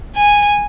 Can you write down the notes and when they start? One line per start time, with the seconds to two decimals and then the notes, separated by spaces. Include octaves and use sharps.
0.16 G#5